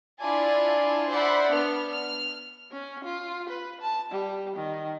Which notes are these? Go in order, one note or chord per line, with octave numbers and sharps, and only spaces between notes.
D4 E4 F4 D5 G#5 A5
C5 D5 E5 F#5 B5
B3 D4 F6
F6
C#4
F4
B4
A5
G3
D#3